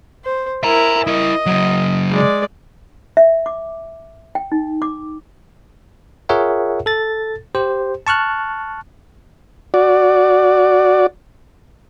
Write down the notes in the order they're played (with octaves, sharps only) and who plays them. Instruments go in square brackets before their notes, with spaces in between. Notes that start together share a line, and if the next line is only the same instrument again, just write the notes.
[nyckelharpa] C5
[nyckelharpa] E4 A#4 [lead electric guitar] G#5 A#5
[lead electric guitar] E4 A#4 [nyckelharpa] D#5
[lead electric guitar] C#3 F#3
[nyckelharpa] G#3 D5
[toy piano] E5
D6
G5
D#4
D6
[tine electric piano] F4 G#4 A#4 C#5 E5 F#5
A4 A6
G4 C5
A5 C#6 F6 F#6
[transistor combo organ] F#4 D5